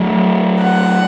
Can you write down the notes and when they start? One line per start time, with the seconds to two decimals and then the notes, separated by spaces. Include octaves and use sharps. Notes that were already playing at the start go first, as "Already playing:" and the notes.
Already playing: F#3 A3
0.62 F#5